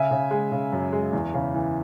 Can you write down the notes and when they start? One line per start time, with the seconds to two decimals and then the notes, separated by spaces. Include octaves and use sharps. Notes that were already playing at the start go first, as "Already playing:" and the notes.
Already playing: C#3 E5 G#5
0.11 C#3
0.31 G#3
0.52 C#3
0.72 F#2
0.92 G#3
1.13 E2
1.34 C#3
1.54 E3